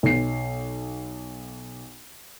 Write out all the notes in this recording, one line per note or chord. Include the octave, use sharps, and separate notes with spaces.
B1 C7